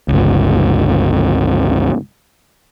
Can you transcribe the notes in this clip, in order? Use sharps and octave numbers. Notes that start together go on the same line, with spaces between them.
G1 C#2